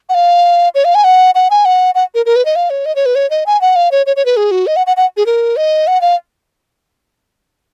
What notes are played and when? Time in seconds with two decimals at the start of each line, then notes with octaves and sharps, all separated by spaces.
0.09 F#5
0.14 F5
0.75 C#5
0.85 F5
0.95 G#5
1.04 F#5
1.35 F#5
1.50 G#5
1.65 F#5
1.95 F#5
2.15 A#4
2.26 A#4
2.36 B4
2.45 D#5
2.56 F5
2.70 C#5
2.85 D#5
2.96 C#5
3.06 B4
3.15 C#5
3.30 D#5
3.46 G#5
3.61 F#5
3.76 F5
3.91 C#5
4.06 C#5
4.16 C#5
4.25 B4
4.37 G#4
4.51 F#4
4.67 D#5
4.76 F#5
4.87 F#5
4.97 F#5
5.17 G#4
5.26 A#4
5.56 D#5
5.87 F#5
6.01 F5